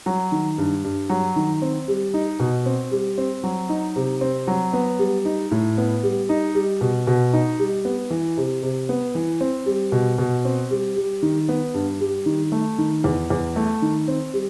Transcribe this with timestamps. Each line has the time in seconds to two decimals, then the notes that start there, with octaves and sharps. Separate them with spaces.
0.06 F#3
0.32 D#3
0.58 G2
0.84 G2
1.10 F#3
1.36 D#3
1.62 C4
1.88 G3
2.14 D#4
2.40 B2
2.66 C4
2.92 G3
3.18 C4
3.44 F#3
3.69 D#4
3.96 C3
4.21 C4
4.47 F#3
4.73 B3
4.99 G3
5.25 D#4
5.51 A2
5.78 B3
6.03 G3
6.29 D#4
6.55 G3
6.81 B2
7.07 B2
7.33 D#4
7.59 G3
7.85 B3
8.10 E3
8.37 C3
8.63 C3
8.89 B3
9.15 E3
9.41 C4
9.66 G3
9.92 B2
10.18 B2
10.45 C4
10.71 G3
10.96 G3
11.23 D#3
11.49 B3
11.74 G2
12.00 G3
12.26 D#3
12.52 A3
12.78 D#3
13.04 E2
13.30 E2
13.56 A3
13.82 D#3
14.08 C4
14.34 G3